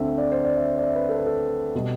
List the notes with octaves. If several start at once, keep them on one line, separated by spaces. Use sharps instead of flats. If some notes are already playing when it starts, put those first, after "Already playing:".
Already playing: D2 D3 A3 C4 E5
D5
C5
D5
E5
D5
E5
B4
A4
B4
A4
B2 G3